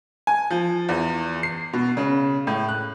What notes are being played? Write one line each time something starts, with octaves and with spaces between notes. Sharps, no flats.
G#5
F3
E2
C7
B2
C#3
A2
F#6